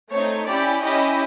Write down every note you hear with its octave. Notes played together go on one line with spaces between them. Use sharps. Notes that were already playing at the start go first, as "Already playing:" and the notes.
A3 C4 D#4 C#5
C#4 E4 G4 D5
C#4 E4 G4 D#5